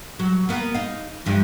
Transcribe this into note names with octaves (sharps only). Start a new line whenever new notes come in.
F#3
A#3 B3
D#4 F5
E2 G2 F3